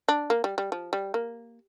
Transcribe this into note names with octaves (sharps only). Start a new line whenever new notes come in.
D4
A#3
G3
G3
F3
G3
A#3